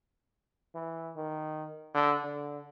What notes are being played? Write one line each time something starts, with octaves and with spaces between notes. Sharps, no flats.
E3
D#3
D3
D3